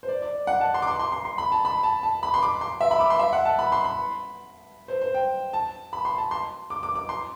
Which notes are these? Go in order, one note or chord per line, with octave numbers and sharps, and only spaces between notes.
C5
D5
D5
F#5
A5
C6
D6
C6
C6
C6
C6
B5
A5
B5
A5
A5
B5
C6
D6
C6
E5
B5
D6
C6
E5
F#5
A5
B5
C6
B5
C5
C5
G5
A5
B5
C6
A5
C6
D6
D6
D6
C6